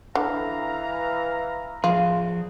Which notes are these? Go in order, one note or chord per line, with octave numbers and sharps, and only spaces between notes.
D3 E3 F5 A#5
F3 F4 G#4